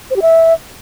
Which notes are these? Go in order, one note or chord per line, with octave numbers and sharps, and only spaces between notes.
C5
G4
E5